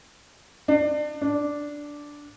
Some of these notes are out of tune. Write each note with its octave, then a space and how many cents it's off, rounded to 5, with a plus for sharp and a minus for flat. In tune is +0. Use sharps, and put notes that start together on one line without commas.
D4 +30
D4 -5